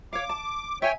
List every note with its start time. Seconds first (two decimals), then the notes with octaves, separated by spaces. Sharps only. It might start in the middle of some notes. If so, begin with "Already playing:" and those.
0.13 C#5 F5 D6
0.29 A5
0.82 C#5 E5 G5 G#5